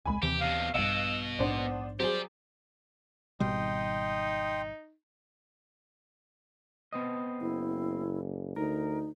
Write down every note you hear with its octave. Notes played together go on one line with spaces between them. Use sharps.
D#1 C2 G#3 G#5 B5
D#2 C3 E3 G4
B2 D3 F5
A#1 G2 B2 D#5 F5 E6 D7
A#1 G#2 B3 D4 C5 D5
F#3 G4 G#4 C5 D5
G#1 B2 G3 D#4 G5 C6 D#6
B3 C4 D#5
F#1 E4
D2 D#4 A#4